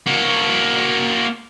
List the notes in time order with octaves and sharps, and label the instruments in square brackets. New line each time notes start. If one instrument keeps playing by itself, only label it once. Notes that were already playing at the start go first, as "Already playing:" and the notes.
[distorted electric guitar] A#3 F#4